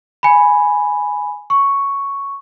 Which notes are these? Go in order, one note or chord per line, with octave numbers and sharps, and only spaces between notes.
G#5 B5
C#6